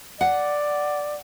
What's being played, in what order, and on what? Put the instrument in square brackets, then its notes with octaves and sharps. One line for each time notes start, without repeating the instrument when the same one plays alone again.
[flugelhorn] D5 [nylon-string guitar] F#5